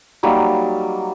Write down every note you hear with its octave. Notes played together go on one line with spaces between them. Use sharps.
F#3 G3 A#3 D#4